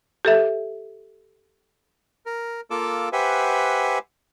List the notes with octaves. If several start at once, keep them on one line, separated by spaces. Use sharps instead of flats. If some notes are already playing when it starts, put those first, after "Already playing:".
G4 A4 E5
A#4
A#3 F4 A4 D6 E6
G4 B4 C5 E5 F#5 G#5